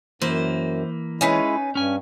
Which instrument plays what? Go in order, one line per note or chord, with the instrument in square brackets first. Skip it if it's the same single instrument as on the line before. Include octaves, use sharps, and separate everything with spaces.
[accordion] F#2 [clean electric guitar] E3 A#3 [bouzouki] C5
[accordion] G#3 E4 [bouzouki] C#4 D#4 B4
[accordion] G2 [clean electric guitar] C#4 G#5